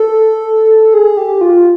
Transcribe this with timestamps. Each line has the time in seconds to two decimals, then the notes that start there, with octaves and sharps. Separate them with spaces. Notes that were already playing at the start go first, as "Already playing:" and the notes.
Already playing: A4
0.94 G#4
1.17 G4
1.41 F4